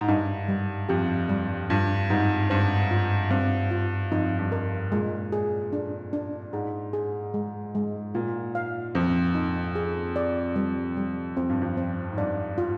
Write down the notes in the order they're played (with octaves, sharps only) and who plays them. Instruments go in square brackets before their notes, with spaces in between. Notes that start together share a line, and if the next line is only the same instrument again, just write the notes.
[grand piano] G#2
[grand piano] G2 [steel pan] D#4
[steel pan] G3
[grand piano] F2 [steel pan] G4
[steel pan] G3
[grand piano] G2 [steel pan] F4
[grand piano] G#2 [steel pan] G3
[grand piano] G2 [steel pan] C5
[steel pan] F4
[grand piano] G2 [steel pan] C4
[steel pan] F4
[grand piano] F2 [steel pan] D#4
[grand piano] G2
[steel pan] A#4
[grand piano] A#2 [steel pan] G#3
[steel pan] G#4
D4
D4
[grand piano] G#2 [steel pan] G#4
[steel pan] G#4
G#3
G#3
[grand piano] A#2 [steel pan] F4
[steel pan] F5
[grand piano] F2 [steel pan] C5
[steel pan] D#4
G#4
D5
G3
G3
[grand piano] F2 [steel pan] C4
[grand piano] G2
F2
[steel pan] C4
[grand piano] G#2
[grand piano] G2 [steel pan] D5
[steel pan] F4